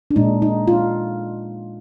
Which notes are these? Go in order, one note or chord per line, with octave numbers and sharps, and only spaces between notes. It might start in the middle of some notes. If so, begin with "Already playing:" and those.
D4
A#2 G#3 D#4
D#4
F4